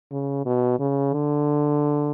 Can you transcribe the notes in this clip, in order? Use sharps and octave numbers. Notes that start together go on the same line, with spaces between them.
C#3
B2
C#3
D3